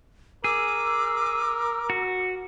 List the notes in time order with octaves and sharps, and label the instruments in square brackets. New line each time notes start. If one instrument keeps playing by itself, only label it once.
[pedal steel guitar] G#4 [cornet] A#4 [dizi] D6 [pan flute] E6
[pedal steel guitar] F#4